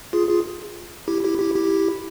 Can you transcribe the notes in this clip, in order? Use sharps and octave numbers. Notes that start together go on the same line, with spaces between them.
F4 G#4
F4 G#4
E4 G4
E4 G4
E4 G4
E4 G4